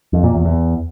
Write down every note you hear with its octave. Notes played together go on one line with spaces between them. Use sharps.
F2
A#2
E2
E2